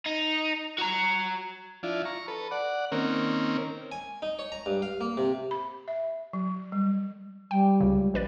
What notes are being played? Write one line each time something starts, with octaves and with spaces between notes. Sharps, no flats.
D#4
F#4 A#5
F3 D4 E4 F4
A#5 C#6
A4 B4
D5 F#5
D#3 A#3 C4 C#4 A#4
G#5
D#4
C#5
A#5
G2
F5
A#3
C3
B5
E5
F#3
G3
G3 G5
C#2 C#3
A#1 B4 D5